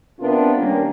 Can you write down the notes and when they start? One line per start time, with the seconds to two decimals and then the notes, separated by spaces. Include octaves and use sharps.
0.20 C3 B3 D4 F4 A#4
0.58 D#3 G3 A#3 C#4 D4